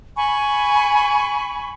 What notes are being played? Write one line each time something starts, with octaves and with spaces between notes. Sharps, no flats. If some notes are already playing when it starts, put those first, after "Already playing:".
G#5 B5 C#6